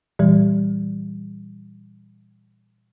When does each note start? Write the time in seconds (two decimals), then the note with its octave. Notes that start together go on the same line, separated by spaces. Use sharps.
0.19 A#2 E3 G3